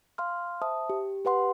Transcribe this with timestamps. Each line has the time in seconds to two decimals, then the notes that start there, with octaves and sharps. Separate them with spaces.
0.18 F5 C6 F6
0.62 C5 E5 A5 D#6
0.89 G4
1.25 G4 B4 F#5 C6